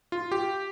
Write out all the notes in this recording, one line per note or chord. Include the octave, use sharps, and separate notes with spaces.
F4
G4